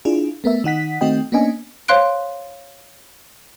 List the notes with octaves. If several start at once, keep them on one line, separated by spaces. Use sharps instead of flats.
D4 E4 F4 G#4
A3 B3 A#4 E5
D#3 D#4 F#5 B6
D#3 A3 C4 F#4 D#5 G5
A#3 B3 C#4 D4 D#5 G#5
C5 C#5 F5 C6 F#6 D7